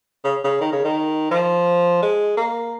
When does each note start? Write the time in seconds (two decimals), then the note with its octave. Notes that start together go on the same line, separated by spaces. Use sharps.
0.24 C#3
0.44 C#3
0.60 D#3
0.72 C#3
0.85 D#3
1.31 F3
2.02 G#3
2.37 A#3